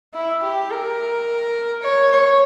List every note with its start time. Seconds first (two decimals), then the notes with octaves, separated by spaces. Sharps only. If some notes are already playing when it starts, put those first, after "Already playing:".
0.14 E4
0.43 G4
0.71 A#4
1.83 C#5
2.11 C#5